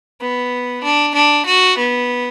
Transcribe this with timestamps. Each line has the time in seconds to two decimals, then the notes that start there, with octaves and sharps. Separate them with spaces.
0.21 B3
0.83 D4
1.14 D4
1.46 F#4
1.78 B3